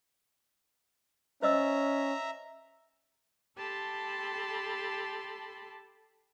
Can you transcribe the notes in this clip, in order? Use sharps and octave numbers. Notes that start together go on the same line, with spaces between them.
C#4 C5 D#5 E5 A#5 E6
G4 A4 A5 B5 C6